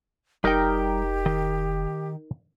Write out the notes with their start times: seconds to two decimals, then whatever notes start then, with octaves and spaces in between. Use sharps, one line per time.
0.44 F1 G3 D#4 G4 A#4 G5
1.26 D#3